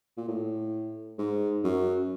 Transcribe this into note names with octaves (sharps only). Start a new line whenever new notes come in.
A#2
A2
G#2
F#2